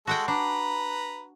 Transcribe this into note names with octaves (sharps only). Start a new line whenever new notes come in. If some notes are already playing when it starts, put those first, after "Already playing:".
G#3 F#4 A4 F#5 G5
D4 B4 A#5